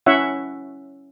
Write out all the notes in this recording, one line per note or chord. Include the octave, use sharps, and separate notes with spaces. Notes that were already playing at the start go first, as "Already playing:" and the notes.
C#4 E4 C#5 E5 F#5